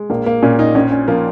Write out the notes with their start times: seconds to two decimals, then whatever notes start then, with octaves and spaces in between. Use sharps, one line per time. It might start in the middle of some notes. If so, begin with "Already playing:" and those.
Already playing: G#3
0.10 A#1 A#3
0.26 A#3
0.42 A#2 C#4
0.59 D#4
0.75 A#1 C#4
0.91 C#4
1.08 F3 A#3